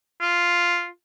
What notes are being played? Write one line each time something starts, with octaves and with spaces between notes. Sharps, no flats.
F4